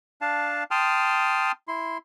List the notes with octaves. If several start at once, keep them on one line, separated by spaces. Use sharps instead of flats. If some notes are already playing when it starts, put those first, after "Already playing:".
D4 F5 A5
G5 A5 C6 D#6 F6
E4 C6